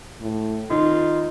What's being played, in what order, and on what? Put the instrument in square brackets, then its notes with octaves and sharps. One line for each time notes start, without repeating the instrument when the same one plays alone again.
[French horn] A2
[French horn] D#3 [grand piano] D#4 [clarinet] F4